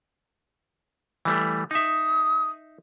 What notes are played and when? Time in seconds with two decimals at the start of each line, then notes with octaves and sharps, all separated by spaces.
1.25 E3 G3 A3
1.71 D#4 E5 D#6